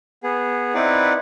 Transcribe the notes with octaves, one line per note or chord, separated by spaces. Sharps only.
B3 G#4
C4 D#4 E4 B4 D5 F#5